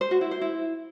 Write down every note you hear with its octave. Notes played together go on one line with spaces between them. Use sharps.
C5
F#4
E4
C5
E4